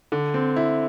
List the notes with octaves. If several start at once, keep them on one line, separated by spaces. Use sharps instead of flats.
D3
C4
E4